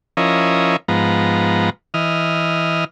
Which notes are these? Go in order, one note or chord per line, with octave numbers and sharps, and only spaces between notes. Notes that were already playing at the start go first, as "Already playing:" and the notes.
F3 C#4 E4 A#4 D#5
G#2 F3 B3 A#5
E3 D#5 F6